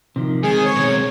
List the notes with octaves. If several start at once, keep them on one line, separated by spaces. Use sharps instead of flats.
C3 D#3 F3
D#3 G#3 C4 G#4 G#5
C#5
B2 D#3